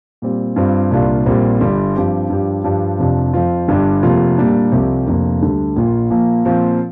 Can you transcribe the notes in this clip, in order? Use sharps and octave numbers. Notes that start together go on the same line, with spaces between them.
A#2 G3 C4
G2 G3 C4 F4
C2 A#2 G3 D4 F4
A#1 A#2 G3 C4
G1 G2 G3
G2 F3 C4 G4
G2 F3 D4 G4
G2 F3 D4 G4
F1 F2 C3 F3 D4
F2 F3 C4 F4
G1 G2 G3 D4 G4
F1 F2 C3 A#3 F4
A#2 G3 A#3 D4
C2 C3 F3 C4 G4
F1 F2 D3 A#3
D2 D3 G3 D4
A#1 A#2 A#3 F4
A#2 F3 A#3
A#2 F3 C4 F4